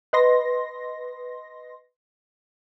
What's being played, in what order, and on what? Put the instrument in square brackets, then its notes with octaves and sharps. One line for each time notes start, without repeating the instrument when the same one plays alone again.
[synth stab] B4 D#5 C6 A#6